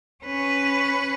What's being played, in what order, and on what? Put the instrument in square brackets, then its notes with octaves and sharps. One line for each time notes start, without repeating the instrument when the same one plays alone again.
[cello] C#4 B4